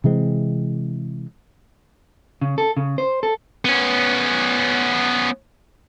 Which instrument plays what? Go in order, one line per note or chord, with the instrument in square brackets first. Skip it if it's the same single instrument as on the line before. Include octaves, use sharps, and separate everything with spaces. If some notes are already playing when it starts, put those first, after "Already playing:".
[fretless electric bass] C3 E3 G#3 C4
[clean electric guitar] C#3
A4
C#3
C5
A4
[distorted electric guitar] B3 C#4